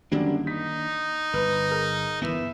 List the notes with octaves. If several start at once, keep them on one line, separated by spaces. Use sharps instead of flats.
F#2 D3 D#3 G3 A#3 D4
D#4 B6
G1 B4
G#4 A#4
G1 D#2 E3 B3 E5